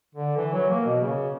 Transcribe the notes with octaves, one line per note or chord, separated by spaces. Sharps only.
D3
E3
F#3
A#3
B2
C#3